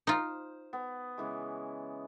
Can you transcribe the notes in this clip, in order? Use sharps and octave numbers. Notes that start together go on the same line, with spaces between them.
D#4 F4 C5
B3
C#3 E3 G#3